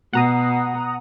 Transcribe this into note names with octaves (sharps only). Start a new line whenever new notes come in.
B2 F#5 A#5 D#6